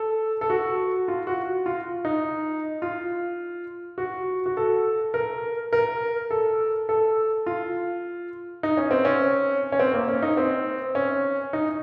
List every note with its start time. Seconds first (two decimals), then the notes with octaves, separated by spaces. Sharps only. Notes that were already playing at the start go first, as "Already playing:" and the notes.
Already playing: A4
0.41 A4
0.50 F#4
1.08 F4
1.27 F#4
1.66 F4
2.05 D#4
2.82 F4
3.98 F#4
4.46 F#4
4.57 A4
5.14 A#4
5.73 A#4
6.31 A4
6.89 A4
7.46 F4
8.63 D#4
8.77 C#4
8.91 C4
9.05 C#4
9.72 C#4
9.79 C4
9.93 A#3
10.08 C#4
10.22 D#4
10.37 C4
10.95 C#4
11.53 D#4